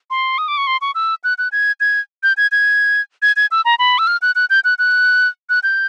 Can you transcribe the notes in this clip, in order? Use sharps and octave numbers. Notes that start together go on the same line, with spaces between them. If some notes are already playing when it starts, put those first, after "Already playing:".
C6
D#6
D6
C#6
C6
C#6
E6
F#6
F#6
G#6
G#6
G6
G#6
G#6
G#6
G#6
E6
A#5
B5
E6
F6
F#6
F#6
G6
F#6
F#6
F#6
G6